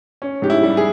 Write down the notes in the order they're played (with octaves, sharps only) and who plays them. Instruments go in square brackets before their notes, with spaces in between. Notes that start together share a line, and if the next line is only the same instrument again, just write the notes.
[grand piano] C#4
G#2 G4
E4
G3
G#4